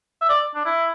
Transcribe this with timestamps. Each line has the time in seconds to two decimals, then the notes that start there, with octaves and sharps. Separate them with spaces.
0.22 E5
0.29 D5
0.55 D4
0.65 E4